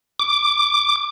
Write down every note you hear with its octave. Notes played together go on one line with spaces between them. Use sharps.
D6